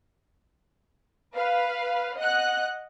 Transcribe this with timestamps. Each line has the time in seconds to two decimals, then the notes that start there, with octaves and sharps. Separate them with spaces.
1.36 B4 F5
2.17 D#5 F#5 F#6